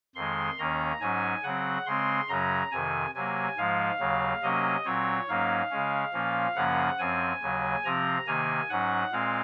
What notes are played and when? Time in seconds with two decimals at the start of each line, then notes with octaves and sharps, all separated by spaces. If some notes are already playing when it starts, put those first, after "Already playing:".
0.15 F2 D#3 G#3 C6
0.58 D#2 D#3 A#3 C#4 A#5
1.01 G#2 F#3 C#4 G#5
1.43 C#3 F#3 C4 F#5
1.86 C#3 G#3 C4 C6
2.28 F#2 C#3 F#3 C#4 A#5
2.72 F2 C3 D#3 G#5
3.14 C3 F#3 A#3 G#5
3.57 G#2 F3 G#3 F5
3.99 D#2 C#3 F#3
4.42 C3 F#3 A#3 C#4 D#5
4.85 A#2 F#3 C4 C#5
5.28 G#2 F#3 A#3 C#4 F5
5.70 C#3 G#3 C#4
6.13 A#2 F3 A#3 C#4
6.55 F#2 C#3 F3 A#3 C#4 F#5
6.99 F#2 F3 C4 G#5
7.41 D#2 C#3 F#3
7.85 C3 F3 C4 A#5
8.27 C3 D#3 A#3 G#5
8.70 G#2 F#3 C#4 F#5
9.12 A#2 G#3 C4 F5